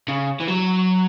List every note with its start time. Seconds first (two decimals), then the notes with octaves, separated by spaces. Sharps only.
0.08 C#3
0.40 E3
0.48 F#3